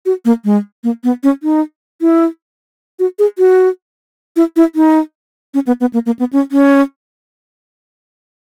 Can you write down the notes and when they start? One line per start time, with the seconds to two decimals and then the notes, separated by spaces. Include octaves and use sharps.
0.06 F#4
0.25 A#3
0.45 G#3
0.84 A#3
1.04 B3
1.23 C#4
1.43 D#4
2.01 E4
2.99 F#4
3.19 G#4
3.38 F#4
4.36 E4
4.56 E4
4.75 D#4
5.54 C#4
5.67 B3
5.81 B3
5.93 A#3
6.06 A#3
6.19 B3
6.33 C#4
6.52 C#4